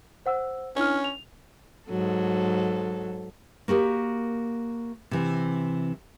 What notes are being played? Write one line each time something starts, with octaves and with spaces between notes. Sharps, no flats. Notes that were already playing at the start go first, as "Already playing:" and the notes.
C5 F#5 E6
C#4 D4 E4 F6
F7
G#2 F#3 A4
A#3 F#4 G4 A#4
C3 E3 C4